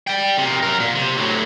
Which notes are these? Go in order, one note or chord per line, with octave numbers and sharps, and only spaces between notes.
D5 G5
C3 A#3
F#3 A#4
A#2
C3
A2 F#3